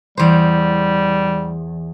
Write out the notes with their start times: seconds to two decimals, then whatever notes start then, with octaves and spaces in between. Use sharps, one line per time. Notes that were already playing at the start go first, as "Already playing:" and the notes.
0.17 E2 G3 C5